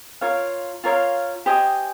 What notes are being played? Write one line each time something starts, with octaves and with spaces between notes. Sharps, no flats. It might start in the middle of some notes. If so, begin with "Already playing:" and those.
F4 A#4 C#5 F5
F4 A#4 C#5 F5
G4 C5 D#5 G#5